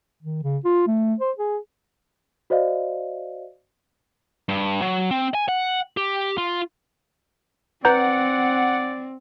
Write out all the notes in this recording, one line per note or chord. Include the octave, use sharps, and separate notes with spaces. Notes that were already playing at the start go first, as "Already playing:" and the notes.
D#3
C#3
F4
A3
C5
G#4
F#4 C5 D5 D#5 F5
G2
F#3
C4
G#5
F#5
G4
F4
C4 B4 D5 F#5 A#5 G6